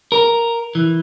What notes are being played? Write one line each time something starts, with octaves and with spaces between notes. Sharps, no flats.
A#4
E3